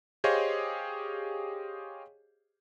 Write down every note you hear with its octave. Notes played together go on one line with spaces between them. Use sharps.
G4 G#4 C5 C#5 D#5 F5